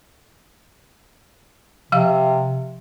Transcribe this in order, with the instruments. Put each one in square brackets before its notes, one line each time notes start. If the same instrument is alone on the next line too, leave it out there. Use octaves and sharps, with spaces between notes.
[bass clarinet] C3 [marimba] F3 F5 E6